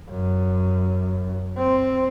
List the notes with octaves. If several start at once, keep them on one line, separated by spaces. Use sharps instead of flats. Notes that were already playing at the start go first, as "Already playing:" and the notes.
F#2
C4